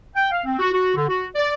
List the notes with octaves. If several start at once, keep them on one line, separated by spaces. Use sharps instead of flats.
G5
F5
C4
F#4
F#4
D3
F#4
D5